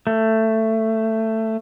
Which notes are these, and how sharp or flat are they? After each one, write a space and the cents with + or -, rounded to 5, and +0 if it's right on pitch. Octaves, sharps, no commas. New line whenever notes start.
A3 +15